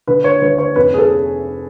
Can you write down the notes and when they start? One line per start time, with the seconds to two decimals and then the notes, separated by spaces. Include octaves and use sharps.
0.07 D3 B4
0.24 C#5
0.42 D2 B4
0.58 C#5
0.76 F1 B4
0.94 G#4
0.99 A4